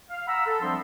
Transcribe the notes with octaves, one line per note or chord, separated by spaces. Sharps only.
F5
F#5 A#5 B5 E6
A4
F3 G3 C4 D4 E5 C6